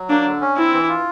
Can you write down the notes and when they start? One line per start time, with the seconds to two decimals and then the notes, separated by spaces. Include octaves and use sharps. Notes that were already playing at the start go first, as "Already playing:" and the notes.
Already playing: F#3
0.09 A#3 D4
0.26 D3
0.41 C#4
0.56 C4 E4
0.73 E3
0.88 F4